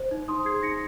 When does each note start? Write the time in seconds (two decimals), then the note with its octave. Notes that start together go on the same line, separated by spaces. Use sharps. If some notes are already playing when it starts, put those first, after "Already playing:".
Already playing: C5
0.11 D#4
0.28 D#4 C6 D#6
0.45 G#4 G#6 C7
0.63 D#4 A#6 C#7